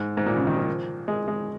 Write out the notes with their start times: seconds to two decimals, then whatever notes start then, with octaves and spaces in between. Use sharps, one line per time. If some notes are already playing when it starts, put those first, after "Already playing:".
Already playing: G#2
0.17 G#2
0.26 A#2
0.37 C#3
0.47 D#3
0.57 F3
1.08 G#3
1.28 G#3